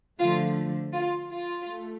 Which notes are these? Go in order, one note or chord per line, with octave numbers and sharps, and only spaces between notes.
D3 F3 A3 F4
F4
F4
A3